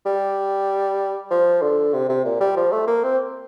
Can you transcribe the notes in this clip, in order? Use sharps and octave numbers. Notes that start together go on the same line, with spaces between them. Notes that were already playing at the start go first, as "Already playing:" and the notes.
G3
F3
D3
C3
C3
A#2
G3
F3
A3
A#3
C4